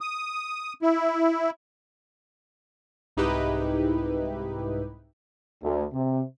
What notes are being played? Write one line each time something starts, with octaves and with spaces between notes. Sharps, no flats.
D#6
E4
C2 G#2 D#4 E4 G4 B4
D2
C3